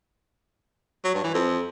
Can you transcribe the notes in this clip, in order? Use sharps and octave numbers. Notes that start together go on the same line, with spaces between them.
F#3
G2
E3
F2